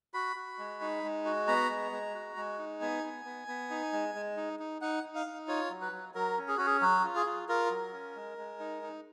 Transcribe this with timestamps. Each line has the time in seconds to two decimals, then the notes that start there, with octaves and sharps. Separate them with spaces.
0.14 F#4 B5
0.36 F#4
0.58 G#3
0.81 D#4
1.03 G#3
1.25 F#4
1.48 B3 A#5
1.70 G#3
1.92 G#3
2.14 F#4
2.37 G#3
2.58 D#4
2.81 B3 G#5
3.04 B3
3.25 B3
3.48 B3
3.70 D#4
3.93 G#3
4.15 G#3
4.37 D#4
4.59 D#4
4.81 D#4 F#5
5.03 D#4
5.15 F5
5.26 D#4
5.48 F4 C#5
5.71 F#3
5.82 B4
5.92 F#3
6.15 F#3 A#4
6.37 C#4
6.48 G#4
6.57 C#4 F#4
6.66 G#4
6.81 F#3 F#4
7.04 F4
7.16 G#4
7.26 F4
7.49 F4 A#4
7.71 F#3
7.92 C#4
8.16 G#3
8.38 G#3
8.59 D#4
8.83 D#4